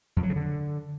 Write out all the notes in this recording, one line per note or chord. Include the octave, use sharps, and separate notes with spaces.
F2
F#3
C#3
D3